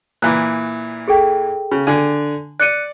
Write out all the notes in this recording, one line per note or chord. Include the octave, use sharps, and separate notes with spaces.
A#2 E3 F#6
G#4 A4 G5
C#3
D3 G#5
D5 F#6 C#7 D#7